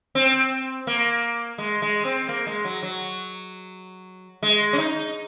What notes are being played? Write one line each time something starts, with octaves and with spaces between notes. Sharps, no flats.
C4
A#3
G#3
G#3
C4
A#3
G#3
F#3
F#3
G#3
C#4
D#4